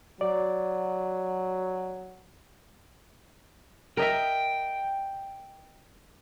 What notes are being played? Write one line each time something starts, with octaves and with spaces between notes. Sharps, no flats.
F#3 D5
A#4 D#5 E5 G5